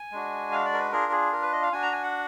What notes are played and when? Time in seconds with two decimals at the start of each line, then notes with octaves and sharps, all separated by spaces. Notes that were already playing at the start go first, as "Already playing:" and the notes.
Already playing: G#5
0.11 G#3 D4 F#4
0.52 F5
0.65 D5
0.73 A#4
0.78 B4
0.92 D4 F4 G#4 A#4
1.12 G#4
1.33 A#4
1.42 B4
1.52 D#5
1.62 F5
1.72 D4 F#4 G#5
1.83 A#5
1.92 G#5
2.03 F#5